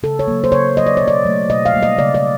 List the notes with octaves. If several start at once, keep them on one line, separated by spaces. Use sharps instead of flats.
C#3 A4
C#5
F#3 A#3
C5
C#3 C#5
F#3 A#3 D#5
D5
B2 C#5
D5
F#3 A3
B2 D#5
F5
G3 A#3
D#5
C#3 D5
D5